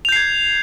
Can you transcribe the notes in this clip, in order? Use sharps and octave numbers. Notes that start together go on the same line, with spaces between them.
G6 G#6 C7 F7